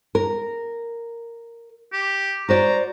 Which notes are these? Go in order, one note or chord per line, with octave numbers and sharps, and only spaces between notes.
A#4
G4
F#4 C5 D5 A#5